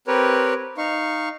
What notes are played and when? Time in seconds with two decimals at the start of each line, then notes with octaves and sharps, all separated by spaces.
0.07 C4 G4 A#4 B4 C#5
0.78 D#4 F5 C#6